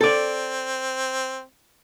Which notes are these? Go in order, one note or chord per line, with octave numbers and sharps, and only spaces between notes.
C4 A4 D5